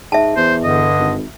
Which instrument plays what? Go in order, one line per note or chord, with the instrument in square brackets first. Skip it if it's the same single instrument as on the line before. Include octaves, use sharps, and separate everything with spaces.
[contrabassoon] G#2 [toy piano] E5 A5
[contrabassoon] E2 [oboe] C5
[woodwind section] G2 D3 [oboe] D#5
[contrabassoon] G#1